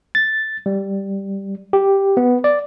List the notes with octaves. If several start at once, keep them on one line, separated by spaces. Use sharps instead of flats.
A6
G3
G4
B3
D5